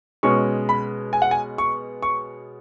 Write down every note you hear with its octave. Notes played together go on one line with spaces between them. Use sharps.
B2 G#3 C#4 C#6
B5
G#5
F#5
G#5
C#6
C#6